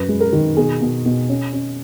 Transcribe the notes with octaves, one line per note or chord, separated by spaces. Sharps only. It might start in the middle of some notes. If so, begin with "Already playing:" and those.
Already playing: F#2 B4
G#3
A#4
D#3
B2 G#4
B2
B2
C#4
C#4